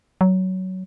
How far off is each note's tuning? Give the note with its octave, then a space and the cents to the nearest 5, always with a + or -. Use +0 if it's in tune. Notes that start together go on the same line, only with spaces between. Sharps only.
F#3 +15